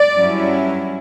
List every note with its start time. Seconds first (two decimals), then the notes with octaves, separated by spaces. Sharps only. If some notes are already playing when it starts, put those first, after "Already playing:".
Already playing: D5
0.15 G2 F#3 C#4 E4